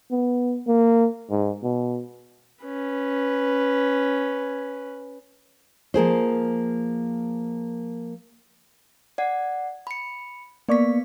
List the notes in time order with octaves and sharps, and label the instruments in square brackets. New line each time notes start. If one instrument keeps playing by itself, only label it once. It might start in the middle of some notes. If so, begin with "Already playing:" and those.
[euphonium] B3
A#3
G#2
B2
[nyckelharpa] C#4 B4
[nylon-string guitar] F3 A#3 G#4 C5
[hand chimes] D5 F#5
B5 C#7
[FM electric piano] A#3 D5 C#6 [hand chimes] B3 B6